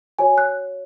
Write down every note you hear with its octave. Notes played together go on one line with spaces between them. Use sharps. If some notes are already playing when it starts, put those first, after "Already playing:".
F#4 C#5 G#5
F#6